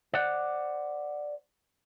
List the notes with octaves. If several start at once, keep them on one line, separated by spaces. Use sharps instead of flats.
C5 D5 F#5